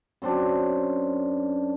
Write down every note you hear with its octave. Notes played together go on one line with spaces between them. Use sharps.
F#2 C4 D4